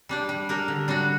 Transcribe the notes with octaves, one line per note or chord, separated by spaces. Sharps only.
G3 D4 G4
G3
D4 G4 A#4
D3
G3 D4 F#4